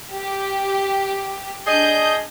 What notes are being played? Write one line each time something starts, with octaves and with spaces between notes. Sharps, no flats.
G4
D4 G#4 D#5 G6